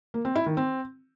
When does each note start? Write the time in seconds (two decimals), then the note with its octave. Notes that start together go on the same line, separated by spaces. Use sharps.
0.14 A#3
0.25 C4
0.36 E4
0.46 D#3
0.57 C4